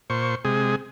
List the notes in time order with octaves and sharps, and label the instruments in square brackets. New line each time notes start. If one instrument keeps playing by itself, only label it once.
[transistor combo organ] A#2 C5 C#6
C3 G#3 G#4